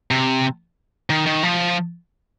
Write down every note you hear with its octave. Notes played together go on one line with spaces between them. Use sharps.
C3
D#3
D#3
F3